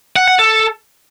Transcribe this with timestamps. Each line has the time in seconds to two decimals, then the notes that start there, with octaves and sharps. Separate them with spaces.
0.16 F#5
0.28 F#5
0.39 A4